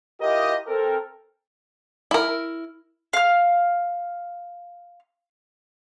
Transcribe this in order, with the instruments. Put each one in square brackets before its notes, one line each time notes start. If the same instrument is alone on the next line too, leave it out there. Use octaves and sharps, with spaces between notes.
[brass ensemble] E4 F4 G4 A#4 D#5
C4 A4 A#4
[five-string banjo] E4 A#4
[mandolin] F5 F6